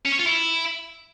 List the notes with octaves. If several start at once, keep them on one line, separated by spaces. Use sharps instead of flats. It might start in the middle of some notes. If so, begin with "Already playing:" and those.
C#4
C#5
F4
E4